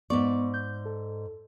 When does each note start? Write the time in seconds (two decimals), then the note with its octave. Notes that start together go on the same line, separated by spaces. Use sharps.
0.10 G#2 B3 D5 C#6
0.54 G6
0.85 A4